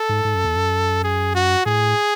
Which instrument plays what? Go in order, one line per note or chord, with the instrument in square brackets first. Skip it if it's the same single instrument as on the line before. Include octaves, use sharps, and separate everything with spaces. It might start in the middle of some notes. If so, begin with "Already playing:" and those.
Already playing: [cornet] A4
[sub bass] G#2
G#2
F#2
E2
F#2
[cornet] G#4
F#4
[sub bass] A2 [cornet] G#4